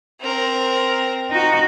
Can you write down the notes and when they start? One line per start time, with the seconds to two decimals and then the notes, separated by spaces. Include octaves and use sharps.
0.21 C4 A#4
1.31 D#4 F#4